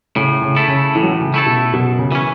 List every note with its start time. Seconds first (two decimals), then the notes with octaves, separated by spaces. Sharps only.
0.16 A2 C#3
0.42 C#3
0.56 A3 E4 A4
0.68 C#3
0.95 A2 E3
1.03 F#3
1.12 E3
1.21 C#3
1.34 A3 E4 A4
1.46 B2
1.73 F#2 B2
1.99 C#3
2.12 E3 C#4